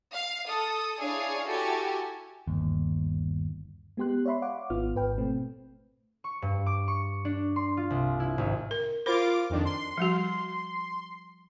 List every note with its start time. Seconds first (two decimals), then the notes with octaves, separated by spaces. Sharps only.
0.14 F5
0.47 A4 D#6
0.99 D4 E4 G#4 C#5 F5
1.48 E4 F#4 G4 A4 G#5
2.47 G1 D#2
3.97 G#3 B3 G4 C6 F#6
4.25 C#5 D5 E5 B5 C6
4.42 C#5 F5 F#5 D6
4.70 G#1 B3 F4 F6
4.94 G#1 G#2 B4 G5
5.18 B2 A3 C4
6.24 C#6
6.42 G2
6.66 D6
6.88 C#6
7.25 D4
7.56 C6
7.77 F4
7.90 C2
8.20 E4
8.38 G#1
8.71 A#4
9.06 F4 A#4 C5 B5 D6
9.50 F2 D#3 D4
9.65 C6
9.98 F3 G3 F#4